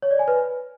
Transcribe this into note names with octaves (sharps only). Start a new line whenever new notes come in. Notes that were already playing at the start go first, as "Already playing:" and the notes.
C#5
D5
G#5
B4